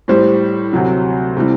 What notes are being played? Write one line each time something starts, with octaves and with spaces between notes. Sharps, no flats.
A2 G3 C5
D2 C3 F#3
C3 E3 G3